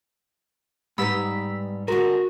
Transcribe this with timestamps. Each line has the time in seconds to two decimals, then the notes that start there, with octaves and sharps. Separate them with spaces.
0.98 G#2 G3 B3 D#4 B5 E6 B6
1.88 D3 G#3 F#4 A#4